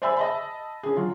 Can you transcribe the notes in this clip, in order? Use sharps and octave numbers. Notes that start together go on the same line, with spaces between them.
C5 D5 E5 G#5 B5 E6
D#5 A5 B5
C#4 G#4
F#3 F4